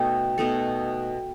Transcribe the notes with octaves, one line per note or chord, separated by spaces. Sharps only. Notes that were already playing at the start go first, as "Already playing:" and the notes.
Already playing: B2 A3 D#4 A4 G5
B2 A3 D#4 A4